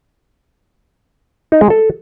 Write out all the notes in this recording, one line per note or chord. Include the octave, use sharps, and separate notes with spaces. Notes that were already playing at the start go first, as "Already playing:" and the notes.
D#4
G#3
A4